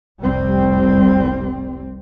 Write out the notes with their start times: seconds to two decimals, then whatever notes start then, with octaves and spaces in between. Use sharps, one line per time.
0.20 F1 C2 G3 C4